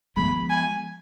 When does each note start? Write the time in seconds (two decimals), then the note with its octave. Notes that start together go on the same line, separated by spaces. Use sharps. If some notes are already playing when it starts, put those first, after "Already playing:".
0.17 F3 G#3 B3 B5
0.50 G#5